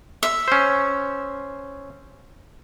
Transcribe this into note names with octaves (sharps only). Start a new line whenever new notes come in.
E5
C#4 C5